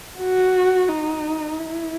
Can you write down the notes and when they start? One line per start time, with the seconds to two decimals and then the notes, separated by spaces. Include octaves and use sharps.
0.19 F#4
0.89 D#4
1.60 E4